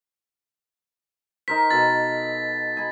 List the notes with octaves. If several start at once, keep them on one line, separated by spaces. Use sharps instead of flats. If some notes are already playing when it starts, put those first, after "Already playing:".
D#4 A#4 C5 B6
B2 A4 F5 A6
G#5 B5